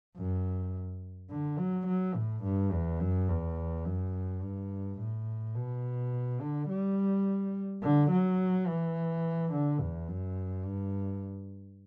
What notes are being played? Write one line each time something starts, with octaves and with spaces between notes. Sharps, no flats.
F#2
D3
F#3
F#3
A2
G2
E2
F#2
E2
F#2
G2
A2
B2
D3
G3
D3
F#3
E3
D3
E2
F#2
G2